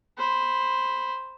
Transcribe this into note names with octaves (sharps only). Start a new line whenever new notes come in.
C5 B5